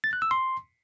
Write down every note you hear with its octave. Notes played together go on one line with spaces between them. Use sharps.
A6
F#6
E6
C6